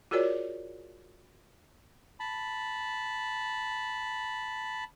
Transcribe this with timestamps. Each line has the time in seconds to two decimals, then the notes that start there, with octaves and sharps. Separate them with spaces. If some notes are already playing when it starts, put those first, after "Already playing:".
0.11 F4 F#4 G#4 A#4 C#5 D5
2.20 A5 B5